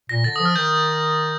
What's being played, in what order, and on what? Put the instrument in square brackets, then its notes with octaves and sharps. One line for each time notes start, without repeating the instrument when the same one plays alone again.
[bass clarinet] A#2 [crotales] A#6
[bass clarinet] D3 [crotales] A6
[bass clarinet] F3 [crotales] D#6
[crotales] F6
[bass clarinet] D#3 [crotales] G6